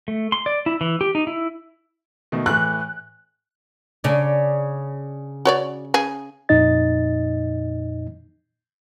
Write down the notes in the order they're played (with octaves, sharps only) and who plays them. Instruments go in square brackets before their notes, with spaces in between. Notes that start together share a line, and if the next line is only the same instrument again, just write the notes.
[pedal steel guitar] A3
C6
D5
E4
E3
G4
D#4
E4
[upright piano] B2 D#3 A3
[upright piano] A2 E3 A3 [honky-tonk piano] F#6
[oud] C#3 D4
[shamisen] F#4 C#5 D5
C#3 G#4
[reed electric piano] F2 A#2 D#4 D#5 A6